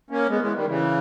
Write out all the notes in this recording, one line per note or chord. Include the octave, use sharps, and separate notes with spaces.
A#3 C#4
G#3 B3
E3 G#3
D#3 G3
C#3 E3